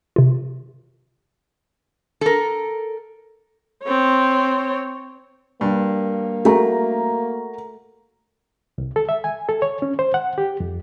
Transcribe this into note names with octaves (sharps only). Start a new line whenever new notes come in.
C3 F4
A4 A#4
C4 C#5
G2 A#3
A3 F#4 A#4 A#5
C2
A4
E5
G#5
A4
C#5
C#4
C5
F#5
G4
F2